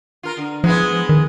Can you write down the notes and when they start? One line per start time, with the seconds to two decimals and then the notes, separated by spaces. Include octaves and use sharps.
0.23 F4 A#4
0.37 D3
0.64 F3 G#3 B3 E4
1.09 D#3